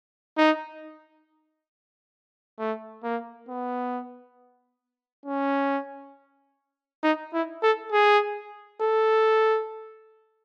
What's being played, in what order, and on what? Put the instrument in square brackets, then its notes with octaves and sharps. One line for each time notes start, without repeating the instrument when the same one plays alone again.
[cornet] D#4
A3
A#3
B3
C#4
D#4
E4
A4
G#4
A4